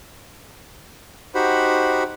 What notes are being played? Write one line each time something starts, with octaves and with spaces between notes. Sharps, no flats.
D#4 F#4 G4 C5 F#5 B5